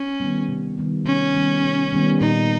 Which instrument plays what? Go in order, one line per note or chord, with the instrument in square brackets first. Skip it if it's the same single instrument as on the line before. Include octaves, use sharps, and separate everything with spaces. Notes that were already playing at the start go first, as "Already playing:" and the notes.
Already playing: [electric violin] C#4
[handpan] D#3 G3 B3
C3
D#3 G3 B3
[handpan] C3 [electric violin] C#4
[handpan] D#3 G3 B3
C3
D#3 G3 B3
[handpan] A#2 [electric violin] D#4